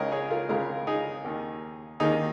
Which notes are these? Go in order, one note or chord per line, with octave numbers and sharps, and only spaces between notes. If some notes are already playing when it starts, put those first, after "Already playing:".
Already playing: C#2 C#3 G#3 G#4 A#4 C#5 D#5
G#4 C#5
F4 A#4
C#2 C#3 G#3 F4 A#4
D#4 G#4
D#2 D#3 A#3
D#2 D#3 A#3 D#4 G#4